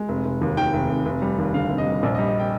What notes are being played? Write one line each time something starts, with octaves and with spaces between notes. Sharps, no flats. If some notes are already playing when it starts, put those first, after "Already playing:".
Already playing: G#3
F1
F1
D#2
D#3 G5
F1
F1
F1
G3
D#2
D3 F5
F1
D#5
G3
A#1 D5
D#5
G3
D#5
G5